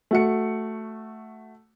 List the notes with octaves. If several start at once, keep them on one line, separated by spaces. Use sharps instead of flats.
A3 F#4 C#7